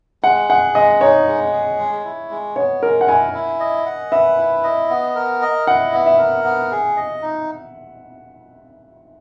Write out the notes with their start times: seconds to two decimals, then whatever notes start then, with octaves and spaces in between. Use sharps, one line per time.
0.23 G#3 F#5
0.49 G#4 F#5
0.75 G#3 D#5
1.01 D#4 C#5
1.27 G#3
1.53 G#4
1.79 G#3
2.05 E4
2.30 G#3
2.56 B3 C#5
2.83 G#3 A#4
3.01 F#5
3.08 E4 G#5
3.34 E4
3.60 D#5
3.86 F#5
4.12 B4 E5
4.38 E4
4.64 D#5
4.90 B3
5.15 A#4
5.42 D#5
5.67 E4 F#5
5.93 B3
6.06 E5
6.19 A#4
6.44 B3
6.71 G#4
6.97 D#5
7.22 D#4